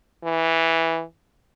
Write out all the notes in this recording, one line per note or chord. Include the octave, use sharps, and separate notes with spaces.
E3